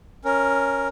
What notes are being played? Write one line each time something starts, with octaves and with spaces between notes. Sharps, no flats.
C#4 A#4